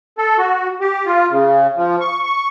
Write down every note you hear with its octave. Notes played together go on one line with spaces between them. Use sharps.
A4
F#4
G4
F4
C#3
F3
C#6
C#6